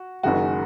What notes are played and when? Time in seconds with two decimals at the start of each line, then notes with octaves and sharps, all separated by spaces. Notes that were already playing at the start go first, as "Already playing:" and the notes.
Already playing: F#4
0.23 F#1 F#2 D#3 G#3 F#4